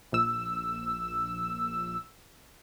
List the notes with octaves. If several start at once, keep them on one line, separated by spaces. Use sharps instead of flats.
A#1 E6